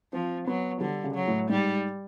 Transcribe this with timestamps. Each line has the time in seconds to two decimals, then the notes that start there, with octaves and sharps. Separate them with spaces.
0.13 F3 C4
0.47 F#3 B3
0.81 D3 G3
1.04 C#3
1.15 F#3
1.27 A2
1.49 G#2 G3